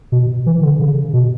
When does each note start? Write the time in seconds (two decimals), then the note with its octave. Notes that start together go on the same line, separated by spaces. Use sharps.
0.12 B2
0.46 E3
0.63 D3
0.80 C#3
1.13 B2